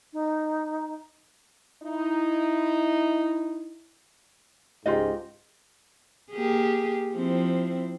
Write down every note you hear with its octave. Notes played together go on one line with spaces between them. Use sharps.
D#4
D#4 E4
C#2 G#2 F4 G4 D#5
A#3 G4 G#4
F3 C4 E4